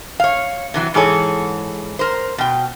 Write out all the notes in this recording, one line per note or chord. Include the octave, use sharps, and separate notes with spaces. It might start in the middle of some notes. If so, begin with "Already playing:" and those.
C#5 F5
C3 E3 F#3
G#2 E3 G#4 A4 C#5
A#4 C5
B2 G5